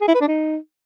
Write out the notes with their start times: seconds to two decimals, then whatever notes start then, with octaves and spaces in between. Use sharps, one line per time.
0.01 G#4
0.08 E4
0.14 B4
0.21 D4
0.28 D#4